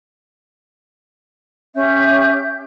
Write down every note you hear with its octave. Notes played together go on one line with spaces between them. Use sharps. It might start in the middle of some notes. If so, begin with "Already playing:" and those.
C#4 G4 E5 G6